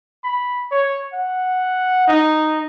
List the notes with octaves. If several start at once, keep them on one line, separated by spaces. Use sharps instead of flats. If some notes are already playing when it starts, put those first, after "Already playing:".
B5
C#5
F#5
D#4